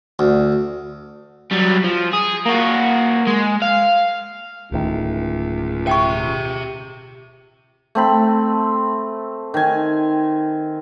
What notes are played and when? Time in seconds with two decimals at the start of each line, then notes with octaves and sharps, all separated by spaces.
0.19 D2
1.51 F#3 G3
1.84 F3
2.13 G#4
2.45 A#3 F#4
3.27 G#3
3.62 F5
4.72 D1 C#2 A2 D#3
5.87 G4 E5 G5 C#6
7.95 A3 C4 B5
9.54 D#3 G#5